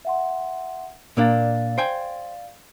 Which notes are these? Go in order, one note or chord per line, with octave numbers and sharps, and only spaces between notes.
E5 F#5 C6
A#2 A#3 D4 D5 F5 A6
C5 G5 G#5